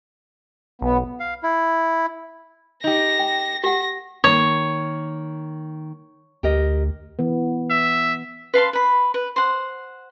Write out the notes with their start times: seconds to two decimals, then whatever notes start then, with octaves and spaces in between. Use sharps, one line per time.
0.82 B1 B3
1.20 F5
1.43 E4
2.84 D#4 G4 A#6
3.19 G5
3.64 G4 F#5 A#6
4.24 D#3 A#3 C#5
6.43 D2 G4 A#4 D#5
7.19 E3 B3
7.70 E5
8.54 B4 F5 A5 C6
8.73 B4 B5
9.14 B4
9.36 C5 F#5